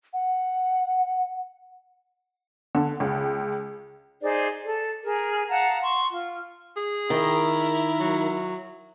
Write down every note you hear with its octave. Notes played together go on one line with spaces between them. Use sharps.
F#5
D3
C#2
D#4 G#4 C5 D5
A4
G#4 A#4
F5 F#5 A5 A#5
C6 C#6
F4
G#4
D#3 E4 A#4
F#3